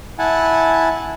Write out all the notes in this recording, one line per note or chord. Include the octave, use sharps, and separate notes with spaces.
E4 F#5 G#5 A5